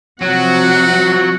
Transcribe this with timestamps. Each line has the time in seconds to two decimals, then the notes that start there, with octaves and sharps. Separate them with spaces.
0.21 C3 F3 F#3 F#4 F#5